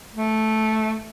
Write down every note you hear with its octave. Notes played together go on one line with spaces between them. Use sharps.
A3